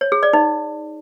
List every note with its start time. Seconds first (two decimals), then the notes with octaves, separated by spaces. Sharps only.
0.01 C#5
0.12 G#4
0.23 D5
0.33 D#4